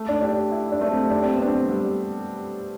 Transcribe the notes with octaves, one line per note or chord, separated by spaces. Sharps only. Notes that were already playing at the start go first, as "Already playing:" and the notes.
Already playing: A3
D4
D4 G4
E4
D4
A3
C4
D4 G4
C4
B3 D4
C4
G3